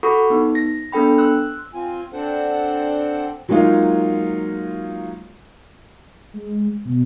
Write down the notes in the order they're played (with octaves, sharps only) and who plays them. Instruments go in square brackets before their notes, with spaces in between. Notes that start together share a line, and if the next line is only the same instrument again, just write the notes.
[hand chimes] F#4 A4 F#5 B5 C#6 D6
B3 D#4
A#6
B3 D4 A4 G5 B5
C6 E6 F#6
[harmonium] C4 F4 G#5
C4 D4 A4 C5 F#5 G5
[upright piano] F#3 G#3 A#3 D#4 F4
[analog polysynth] G#3
B2